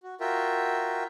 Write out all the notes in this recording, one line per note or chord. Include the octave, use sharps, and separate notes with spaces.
F#4
F4 F#4 A#4 E5 G5